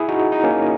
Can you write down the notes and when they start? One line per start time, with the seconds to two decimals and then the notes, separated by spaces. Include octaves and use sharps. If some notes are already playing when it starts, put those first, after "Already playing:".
Already playing: E4 G#4
0.08 D#4 F#4
0.32 D#4
0.44 A#3 C#4